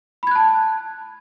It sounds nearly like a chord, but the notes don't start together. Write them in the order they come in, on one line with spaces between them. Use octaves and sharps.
B5 G#6 F#6 A5